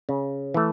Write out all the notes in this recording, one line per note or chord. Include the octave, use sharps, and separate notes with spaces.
C#3
E3 A3